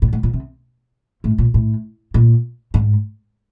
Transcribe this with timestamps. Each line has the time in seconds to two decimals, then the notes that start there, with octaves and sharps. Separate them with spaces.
0.02 A2
0.13 A2
0.23 A#2
0.33 C3
1.24 A2
1.38 A#2
1.54 A2
2.14 A#2
2.74 G#2